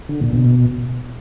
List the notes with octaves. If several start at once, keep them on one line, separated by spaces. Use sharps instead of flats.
D3
A#2
B2